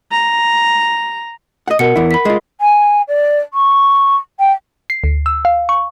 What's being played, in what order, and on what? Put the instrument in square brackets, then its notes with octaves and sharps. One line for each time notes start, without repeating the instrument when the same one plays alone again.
[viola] A#5
[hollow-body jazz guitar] D#5 F#5
[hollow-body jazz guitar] B2 [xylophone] A#4 F#5 C#7
[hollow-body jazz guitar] E2 E4
[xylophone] B5 B6
[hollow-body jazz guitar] G#3 F4
[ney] G#5
D5
C#6
G5
[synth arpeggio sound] C7
D2
E6
F5
C#6